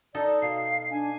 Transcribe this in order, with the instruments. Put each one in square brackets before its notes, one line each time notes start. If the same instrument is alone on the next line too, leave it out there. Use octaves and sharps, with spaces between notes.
[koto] D#4 A4 [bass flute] D5
[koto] B2 [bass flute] F5 [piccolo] C7
[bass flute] D4 [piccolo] G#5